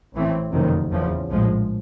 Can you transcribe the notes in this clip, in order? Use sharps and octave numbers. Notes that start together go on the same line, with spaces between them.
A1 A2 E3 A3 C4
F#1 F2 C3 D#3
F#1 E2 C#3 F3
A#1 A2 F3 G#3